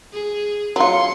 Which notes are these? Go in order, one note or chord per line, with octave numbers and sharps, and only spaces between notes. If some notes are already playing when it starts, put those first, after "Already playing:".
G#4
F#3 F4 C6 C#7